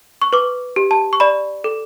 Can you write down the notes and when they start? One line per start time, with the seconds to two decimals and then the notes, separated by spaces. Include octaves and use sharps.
0.22 C#6
0.33 B4 D6
0.76 G4
0.91 A5
1.13 C#6
1.20 D5 B5
1.64 A4